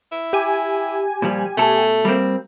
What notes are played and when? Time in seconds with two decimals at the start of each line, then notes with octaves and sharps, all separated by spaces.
0.12 E4
0.33 G4 G#5
1.22 A#2 F3 G3
1.57 B2 A3 A4
2.05 G3 A#3 C4